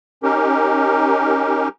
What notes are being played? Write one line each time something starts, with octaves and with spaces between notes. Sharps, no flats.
C#4 D#4 G4 A#4